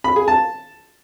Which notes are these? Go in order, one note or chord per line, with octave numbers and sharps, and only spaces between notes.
B5
G#4
A5